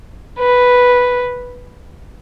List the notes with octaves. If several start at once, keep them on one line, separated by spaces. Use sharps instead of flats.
B4